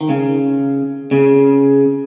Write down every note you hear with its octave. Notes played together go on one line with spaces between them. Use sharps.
D#3
C#3
C#3